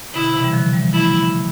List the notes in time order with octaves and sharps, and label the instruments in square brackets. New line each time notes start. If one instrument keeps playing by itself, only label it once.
[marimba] B2 D3 [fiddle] E4
[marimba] C3 E3
G3
D3 F3
E3 G3
[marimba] F3 A3 [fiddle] E4